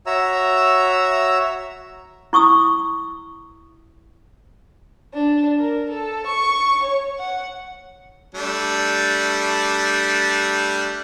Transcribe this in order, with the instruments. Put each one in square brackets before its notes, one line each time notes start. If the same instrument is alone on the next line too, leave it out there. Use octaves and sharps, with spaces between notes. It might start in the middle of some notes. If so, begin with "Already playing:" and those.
[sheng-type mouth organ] F#4 C#5 E5 A#5 E6
[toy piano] E4 C#6 D#6 E6
[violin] D4
A#4
A4
C#6
C#5
F#5
[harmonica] G3 A3 D4